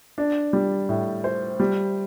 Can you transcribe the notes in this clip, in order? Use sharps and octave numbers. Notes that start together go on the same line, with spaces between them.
D4
G3
A2
C5
G3